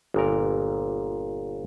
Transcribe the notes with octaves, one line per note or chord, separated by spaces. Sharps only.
G1 A#2 A#4